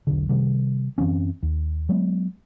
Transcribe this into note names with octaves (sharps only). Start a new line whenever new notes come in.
E1 B1 D3
C3 D#3 G3
F#2 E3 C4 C#4
D#2
F#3 G#3 B3